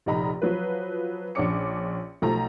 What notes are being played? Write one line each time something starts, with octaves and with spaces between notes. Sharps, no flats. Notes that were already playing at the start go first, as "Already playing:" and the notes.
F1 A#1 D#4 A#5 B5
F3 F#3 B4
A#1 C#4 D4 C#5 D6 C#7
B1 F3 A3 A4 A#5